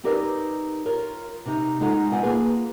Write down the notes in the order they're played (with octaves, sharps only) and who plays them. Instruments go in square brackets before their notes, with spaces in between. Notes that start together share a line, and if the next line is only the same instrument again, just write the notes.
[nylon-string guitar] C4 D#4 G4 A#4 B4 D5
F4 A#4 C#5
C3 D#4
G#3 D#4 F4 A4 F#5
B2 C4 F4 F#5 G#5
A#3 F4 G#4 B4